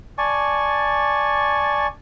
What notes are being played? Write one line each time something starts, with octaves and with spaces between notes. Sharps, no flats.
D5 G#5 A5 C#6